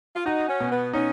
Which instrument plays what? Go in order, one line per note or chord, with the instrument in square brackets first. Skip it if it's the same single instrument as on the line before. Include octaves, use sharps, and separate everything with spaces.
[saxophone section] F4
[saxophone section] D#4 [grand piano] F#4
[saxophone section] C#4
[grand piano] B2
[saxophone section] B3
[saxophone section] C#4 [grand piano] D#4